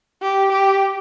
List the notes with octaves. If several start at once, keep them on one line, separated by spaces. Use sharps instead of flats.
G4
G4